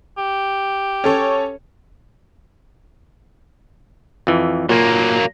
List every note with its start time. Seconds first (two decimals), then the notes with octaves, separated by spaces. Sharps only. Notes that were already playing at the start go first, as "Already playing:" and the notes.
0.18 G4
1.04 C#4 A4 C#5
4.27 F2 E3
4.69 A#2 F#3 A#3